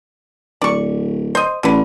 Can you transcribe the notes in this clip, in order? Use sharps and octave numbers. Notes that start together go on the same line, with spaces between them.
D1 D5 C#6
C5 D#5
A1 D3 B4